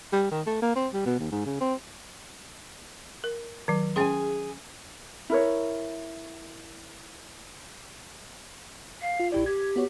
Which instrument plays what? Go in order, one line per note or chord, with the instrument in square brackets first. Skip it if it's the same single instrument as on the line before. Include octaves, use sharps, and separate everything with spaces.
[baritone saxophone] G3
D#3
A3
A#3
C4
G3
B2
D#2
G#2
C#3
C4
[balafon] A#4
D#3 F#3
[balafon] C#4 G5 C6 [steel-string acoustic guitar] G#4 G#5
[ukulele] E4 A#4 C#5
[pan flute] F5
[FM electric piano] F4
[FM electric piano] A#1 G4 D5 [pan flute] E4
[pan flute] G4 [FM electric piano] G#6
[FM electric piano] B3 F#4 C#5